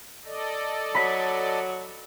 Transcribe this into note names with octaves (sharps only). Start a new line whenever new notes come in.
A4 D5 D#5
F#3 B5 B6